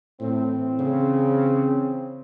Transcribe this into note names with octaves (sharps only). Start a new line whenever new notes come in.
A2 E3 C4
C#3